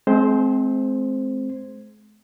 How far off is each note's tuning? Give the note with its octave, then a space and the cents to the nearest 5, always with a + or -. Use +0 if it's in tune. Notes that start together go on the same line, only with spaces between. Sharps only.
G#3 +45 C4 +0 C5 +0